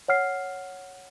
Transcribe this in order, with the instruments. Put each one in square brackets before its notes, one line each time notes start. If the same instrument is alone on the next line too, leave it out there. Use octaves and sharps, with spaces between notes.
[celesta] C#5 F#5 F6 C7